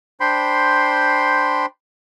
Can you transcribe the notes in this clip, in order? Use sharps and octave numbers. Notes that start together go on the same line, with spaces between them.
D4 C5 G5 B5 C6